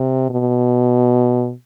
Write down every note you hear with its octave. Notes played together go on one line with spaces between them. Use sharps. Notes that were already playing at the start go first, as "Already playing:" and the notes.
Already playing: C3
B2